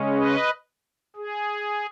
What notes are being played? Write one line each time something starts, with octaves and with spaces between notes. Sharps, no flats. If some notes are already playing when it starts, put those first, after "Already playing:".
Already playing: C#3 G#3 C#4
B4 D#5
G#4